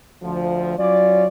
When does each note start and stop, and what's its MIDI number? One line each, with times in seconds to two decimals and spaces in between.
0.23 0.75 38
0.23 0.75 53
0.78 1.26 54
0.78 1.26 61
0.78 1.26 65
0.78 1.26 73
0.78 1.26 74